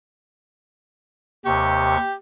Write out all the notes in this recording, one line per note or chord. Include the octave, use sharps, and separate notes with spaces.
D#2 C3 G4 C#6